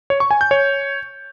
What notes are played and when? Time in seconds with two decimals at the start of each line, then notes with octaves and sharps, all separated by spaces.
0.10 C#5
0.20 C#6
0.31 G#5
0.41 G6
0.51 C#5